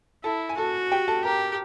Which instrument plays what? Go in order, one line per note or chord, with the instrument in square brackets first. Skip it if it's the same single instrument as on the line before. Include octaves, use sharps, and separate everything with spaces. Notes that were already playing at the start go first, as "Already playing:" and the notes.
[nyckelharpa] E4 [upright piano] A4 A5
[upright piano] G#5
[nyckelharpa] F#4 [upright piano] A4 A5
[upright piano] G4 G5
A4 A5
[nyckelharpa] G4 [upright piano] A#4 A#5